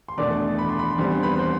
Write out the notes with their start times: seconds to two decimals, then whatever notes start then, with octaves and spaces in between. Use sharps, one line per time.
0.09 C6
0.18 E2 B2 A3 D4 D5 D6
0.59 B5
0.69 C6
0.79 B5
0.90 C6
0.98 E2 D3 G3 C4 B5
1.12 C6
1.23 B4 B5
1.39 C5 C6